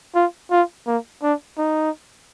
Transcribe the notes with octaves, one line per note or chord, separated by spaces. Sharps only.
F4
F4
A#3
D4
D#4